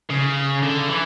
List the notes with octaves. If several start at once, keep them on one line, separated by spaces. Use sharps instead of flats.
C#3
D3
E3